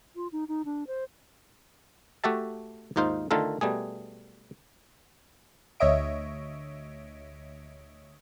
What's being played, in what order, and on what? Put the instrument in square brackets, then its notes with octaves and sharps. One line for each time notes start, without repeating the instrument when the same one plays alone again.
[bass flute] F4
D#4
D#4
D4
C5
[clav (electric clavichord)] A3 F#4 G4 E5 A5
D#2 G#2 D#4 F4 C5
D3 D#3 A3 F4 A4 A#4
B2 G3 A3 G#4
[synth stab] D2 C#5 D#5 E5 D7